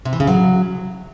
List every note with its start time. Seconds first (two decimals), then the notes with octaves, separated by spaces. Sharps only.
0.05 C3
0.13 E3
0.20 C#3
0.27 F#3